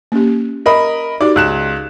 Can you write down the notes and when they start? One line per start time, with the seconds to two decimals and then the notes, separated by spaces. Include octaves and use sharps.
0.12 A#3 C#4 G4
0.66 A#4 D#5 B5
1.21 D#4 F#4 G4 D5
1.36 C#2 F#6 E7